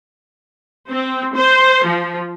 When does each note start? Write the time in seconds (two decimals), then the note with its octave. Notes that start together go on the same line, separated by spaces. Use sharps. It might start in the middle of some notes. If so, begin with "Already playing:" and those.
0.90 C4
1.35 C5
1.86 F3